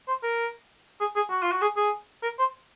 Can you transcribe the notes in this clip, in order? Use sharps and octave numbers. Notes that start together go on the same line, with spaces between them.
C5
A#4
G#4
G#4
F#4
F4
F#4
G#4
G#4
A#4
C5